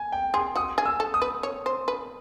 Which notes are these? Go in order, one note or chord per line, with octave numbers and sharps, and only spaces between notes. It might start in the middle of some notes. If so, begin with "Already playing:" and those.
Already playing: G#5
G5
G#4 C6
F#4 D#6
G#4
E6
A4
D#6
B4
C#5
C5
B4